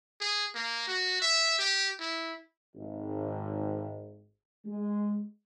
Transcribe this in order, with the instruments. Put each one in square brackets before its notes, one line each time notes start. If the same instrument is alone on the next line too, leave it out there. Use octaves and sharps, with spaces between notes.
[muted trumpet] G#4
A#3
F#4
E5
G4
E4
[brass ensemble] G#1
G#3